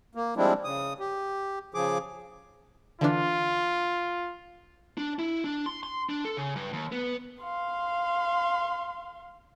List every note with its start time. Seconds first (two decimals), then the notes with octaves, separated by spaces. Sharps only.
0.15 A#3
0.37 F3 G3 G#3 C4 D4 E4
0.64 C#3 D#6
1.00 G4
1.74 C#3 F3 G#4 D6
3.01 D3 E3 D4 F4
4.98 D4
5.19 E4
5.44 D4
5.66 C6
5.83 C6
6.09 D4
6.25 A4
6.37 C#3
6.56 G2
6.73 D#2
6.92 B3
7.42 F5 C6